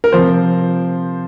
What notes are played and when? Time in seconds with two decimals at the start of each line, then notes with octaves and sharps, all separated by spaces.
0.04 A#4
0.12 C3 F3 C5